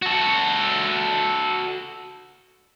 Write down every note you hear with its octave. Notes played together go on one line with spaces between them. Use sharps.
F#4 A4